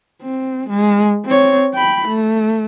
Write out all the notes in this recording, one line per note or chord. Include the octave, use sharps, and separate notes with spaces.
C4
G#3
C4 C#5
G5 B5
A3